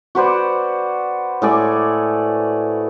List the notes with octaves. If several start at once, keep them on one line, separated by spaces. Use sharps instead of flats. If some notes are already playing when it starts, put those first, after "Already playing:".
F#4 B4 C5 D5
A2 G#4 D5